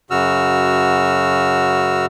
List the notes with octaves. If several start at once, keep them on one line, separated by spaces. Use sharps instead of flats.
F#2 C#3 F#4 E6 F6